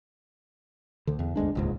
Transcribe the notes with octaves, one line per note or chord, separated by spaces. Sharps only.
D2 D3
E2
G1 D2 G#3 D4
D#1 C#2 G#2